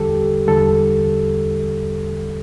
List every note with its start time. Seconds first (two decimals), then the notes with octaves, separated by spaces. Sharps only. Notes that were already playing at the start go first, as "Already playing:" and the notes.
Already playing: E2 D3 G3 G4 A4
0.47 E2 D3 G3 A4